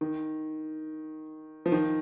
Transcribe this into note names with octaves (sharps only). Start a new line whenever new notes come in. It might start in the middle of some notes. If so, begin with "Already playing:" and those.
D#3
F3
D#3